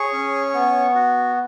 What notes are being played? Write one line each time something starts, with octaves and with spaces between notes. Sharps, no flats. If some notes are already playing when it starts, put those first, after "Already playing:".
Already playing: G#4 C#5 C#6
C#4
B3
F#4